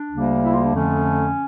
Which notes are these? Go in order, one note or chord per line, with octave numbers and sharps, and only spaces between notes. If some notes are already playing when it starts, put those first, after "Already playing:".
Already playing: D4
D2 C#3 G3 A#3
E4
F4
D4
F2 D3 F3 A3 C#4